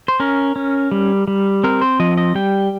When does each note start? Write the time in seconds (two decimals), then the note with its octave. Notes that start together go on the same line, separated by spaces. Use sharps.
0.08 C5
0.20 C#4 A#4
0.56 C#4
0.91 G3
1.28 G3
1.64 C4 A#4
1.81 C5
2.00 F3 D#5
2.17 D#5
2.35 G3 G5